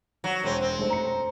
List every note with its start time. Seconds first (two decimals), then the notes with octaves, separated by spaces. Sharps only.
0.24 F#3 F#5 C#6
0.43 E1 B2 C4 C#5 D#7
0.61 C4
0.78 F1 A3 C5
0.90 A#5 C#7